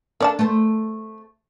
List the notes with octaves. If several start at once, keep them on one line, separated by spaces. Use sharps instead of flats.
D4 A4 A#4 D5 A5
A3 C5